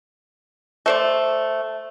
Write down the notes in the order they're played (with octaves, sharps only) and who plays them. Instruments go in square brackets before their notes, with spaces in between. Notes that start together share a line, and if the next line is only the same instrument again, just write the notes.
[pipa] A3 C5 D5